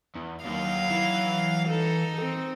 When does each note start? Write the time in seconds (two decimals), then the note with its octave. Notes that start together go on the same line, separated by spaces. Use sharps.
0.16 E2
0.45 D#2 D#3 F#3 F5
0.90 E3
1.69 D#4 A4
2.21 C4